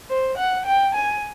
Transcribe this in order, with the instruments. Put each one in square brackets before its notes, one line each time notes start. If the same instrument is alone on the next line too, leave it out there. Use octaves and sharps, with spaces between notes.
[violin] C5
F#5
G5
G#5